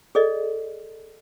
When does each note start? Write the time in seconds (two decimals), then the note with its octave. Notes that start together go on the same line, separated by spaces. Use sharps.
0.15 G#4 A4 D5 D#5